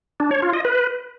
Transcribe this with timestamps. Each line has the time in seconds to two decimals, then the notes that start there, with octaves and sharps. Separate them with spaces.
0.20 D4
0.31 C#5
0.42 F4
0.53 D#5
0.65 B4